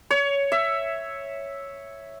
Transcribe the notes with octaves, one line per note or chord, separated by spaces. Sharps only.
C#5
E5